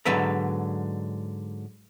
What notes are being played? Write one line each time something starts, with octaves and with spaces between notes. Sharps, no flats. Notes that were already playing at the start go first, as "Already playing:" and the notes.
G#2 D3 F#3 B4 E5 A#5